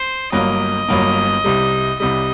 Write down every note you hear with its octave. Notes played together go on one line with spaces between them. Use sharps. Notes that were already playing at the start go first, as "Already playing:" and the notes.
Already playing: C5
G1 G2 F#3 A#3 D#5
G1 G2 F#3 A#3
C2 C3 G3
C2 C3 G3 D#5